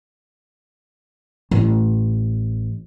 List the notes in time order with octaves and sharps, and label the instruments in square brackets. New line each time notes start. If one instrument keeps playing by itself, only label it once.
[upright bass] A1